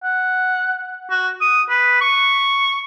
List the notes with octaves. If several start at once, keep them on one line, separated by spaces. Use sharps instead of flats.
F#5
F#4
D#6
B4
C#6